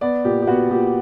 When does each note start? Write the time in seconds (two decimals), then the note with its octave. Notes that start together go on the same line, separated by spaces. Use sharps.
0.01 B3 D5
0.24 A#2 G4
0.42 G4
0.47 B3 F#4
0.70 A#2 G4